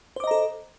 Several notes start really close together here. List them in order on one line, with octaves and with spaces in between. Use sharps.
C5 D6 D#5 A#5 A4